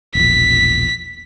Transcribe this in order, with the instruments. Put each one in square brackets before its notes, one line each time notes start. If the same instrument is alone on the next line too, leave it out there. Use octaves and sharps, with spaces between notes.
[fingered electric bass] E1 A#1 [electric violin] B6